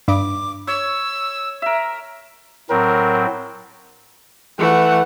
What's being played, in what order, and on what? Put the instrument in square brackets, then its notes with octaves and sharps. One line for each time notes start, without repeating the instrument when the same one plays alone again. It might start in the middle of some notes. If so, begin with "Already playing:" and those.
[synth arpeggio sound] G2 [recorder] D6
[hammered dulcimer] C#5 [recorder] E6
[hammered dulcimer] A#4 E5
[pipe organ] A2 F#3 C4 [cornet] A#4
[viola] E3 [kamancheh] A3 F#5